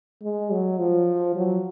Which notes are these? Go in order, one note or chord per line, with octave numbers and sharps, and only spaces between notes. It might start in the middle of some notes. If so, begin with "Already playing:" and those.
G#3
F#3
F3
F#3